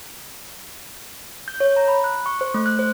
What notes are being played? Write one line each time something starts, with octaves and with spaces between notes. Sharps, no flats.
G6
C#5
A#5
B5
F#6
C#6
C5
A3
F#6
C5